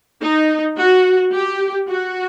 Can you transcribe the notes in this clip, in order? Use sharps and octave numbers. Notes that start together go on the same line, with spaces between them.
D#4
F#4
G4
F#4